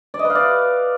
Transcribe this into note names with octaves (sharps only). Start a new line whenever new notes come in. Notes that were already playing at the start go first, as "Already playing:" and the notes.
D5
D#5
B4
F5
D5